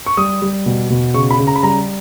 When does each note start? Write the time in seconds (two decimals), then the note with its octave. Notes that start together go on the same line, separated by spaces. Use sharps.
0.06 C#6
0.17 G3 D#6
0.42 G3
0.66 B2
0.90 B2
1.14 C#3 C#6
1.31 B5
1.38 C#3
1.47 A#5
1.56 B5
1.63 G3 A#5